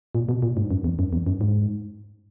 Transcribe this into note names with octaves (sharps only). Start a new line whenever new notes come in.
A#2
B2
A#2
G#2
F#2
E2
F#2
E2
F#2
G#2